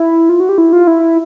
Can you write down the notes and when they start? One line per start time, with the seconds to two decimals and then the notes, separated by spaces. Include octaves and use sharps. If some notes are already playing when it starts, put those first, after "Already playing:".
Already playing: E4
0.29 F4
0.40 F#4
0.49 G4
0.58 E4
0.73 F4
0.87 E4